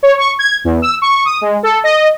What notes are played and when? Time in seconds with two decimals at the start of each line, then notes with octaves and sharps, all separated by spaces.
0.03 C#5
0.18 C#6
0.39 G#6
0.64 E2
0.82 E6
1.02 C#6
1.25 D#6
1.41 G#3
1.63 A4
1.84 D#5